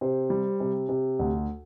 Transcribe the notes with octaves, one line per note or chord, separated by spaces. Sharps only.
C3 C5
G3
C3
C3
D2